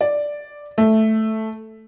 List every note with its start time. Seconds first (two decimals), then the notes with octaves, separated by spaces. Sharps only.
0.01 D5
0.78 A3